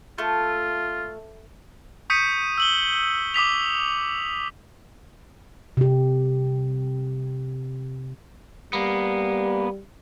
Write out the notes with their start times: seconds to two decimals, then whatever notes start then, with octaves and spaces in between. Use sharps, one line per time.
0.18 A3 F4
2.10 C#6 D#6 G6 B6 C#7 D#7
2.58 E6 F#7 G7
3.34 D6 D#6 B6 F7
5.77 C3 G4
8.73 G3 A#3 B3